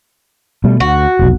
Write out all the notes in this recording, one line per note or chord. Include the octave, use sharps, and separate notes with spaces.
B2 G3 A3
D2 F#4
F1 B1